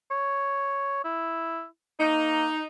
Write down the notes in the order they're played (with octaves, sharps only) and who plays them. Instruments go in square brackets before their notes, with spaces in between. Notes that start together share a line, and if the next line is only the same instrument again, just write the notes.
[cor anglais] C#5
E4
[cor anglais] A#3 [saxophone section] D#4